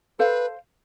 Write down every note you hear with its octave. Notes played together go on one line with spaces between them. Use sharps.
A4 B4 C5 F5